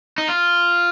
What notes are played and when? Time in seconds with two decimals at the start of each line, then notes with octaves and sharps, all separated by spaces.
0.18 D#4
0.28 F4